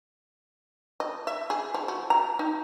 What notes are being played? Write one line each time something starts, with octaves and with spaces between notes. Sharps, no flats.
D#5
E5
G#4
F3
F#4
A#5
D#4